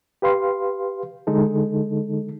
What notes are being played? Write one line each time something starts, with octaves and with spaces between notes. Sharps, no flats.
G4 B4 F5 C6
D3 G#3 D#4 A4